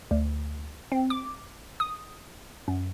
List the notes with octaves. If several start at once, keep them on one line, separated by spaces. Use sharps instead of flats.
D2
C4
D6
D#6
F#2